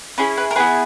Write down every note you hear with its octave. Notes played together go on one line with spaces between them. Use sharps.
C#4 E4 G#4 B4
B4
A#4
B3 E4 G#4 B4